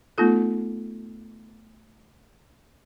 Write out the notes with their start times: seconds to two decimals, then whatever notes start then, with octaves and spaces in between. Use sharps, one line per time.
0.18 A3 B3 D#4 F4 A4